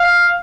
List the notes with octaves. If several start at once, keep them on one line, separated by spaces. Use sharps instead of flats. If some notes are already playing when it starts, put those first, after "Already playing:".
Already playing: F5